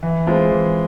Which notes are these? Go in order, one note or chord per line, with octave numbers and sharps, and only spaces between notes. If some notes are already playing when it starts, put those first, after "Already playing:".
E3
G#3 C4 F4
E3